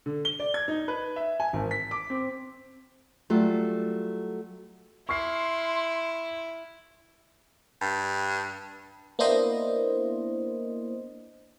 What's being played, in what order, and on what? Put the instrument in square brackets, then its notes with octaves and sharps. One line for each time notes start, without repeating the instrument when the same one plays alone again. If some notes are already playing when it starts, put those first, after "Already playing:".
[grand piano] D3
G7
D5
G#6
D#4
B4
E5
G#5
G#1
B6
D6
C4
[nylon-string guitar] F#3 G3 A3 F4
[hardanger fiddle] E4 [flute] C6 [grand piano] C#6 F6 C7
[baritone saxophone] G2
[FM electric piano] A#3 B3 D4 E4 C5 D#5